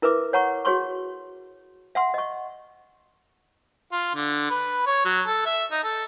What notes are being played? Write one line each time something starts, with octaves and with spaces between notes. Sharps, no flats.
E4 A#4 B4 E5 D6
C#5 F#5 A#5 C#6
F#4 G#4 C#5 C6 C#6
E5 F#5 C6
D#5 C#6
F4
D3
B4
C#5
F#3
A4
E5
D#4
A4